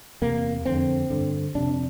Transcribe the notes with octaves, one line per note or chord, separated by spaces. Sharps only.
E2 C3 A#3
F2 D3 C4
G2 D3
F2 C3 D4